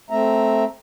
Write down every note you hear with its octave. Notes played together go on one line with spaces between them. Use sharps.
A3 C4 E5 A#5